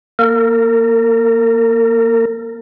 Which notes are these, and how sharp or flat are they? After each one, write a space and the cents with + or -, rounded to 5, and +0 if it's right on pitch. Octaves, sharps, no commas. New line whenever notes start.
A#3 +0 A#4 -35